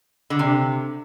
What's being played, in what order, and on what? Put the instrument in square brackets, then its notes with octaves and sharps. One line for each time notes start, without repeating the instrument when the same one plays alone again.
[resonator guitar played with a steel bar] D3
C3